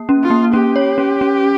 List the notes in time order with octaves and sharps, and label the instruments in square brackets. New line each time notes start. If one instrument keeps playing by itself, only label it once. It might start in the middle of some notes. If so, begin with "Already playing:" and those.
Already playing: [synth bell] A#3
C#4
[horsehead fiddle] F4
[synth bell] A#3
[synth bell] C#4 [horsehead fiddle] G4
[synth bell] C#5
C#4
C#4